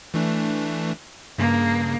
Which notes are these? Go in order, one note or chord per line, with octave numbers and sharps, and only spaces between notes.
E3 A3 D4
G2 C#3 A#3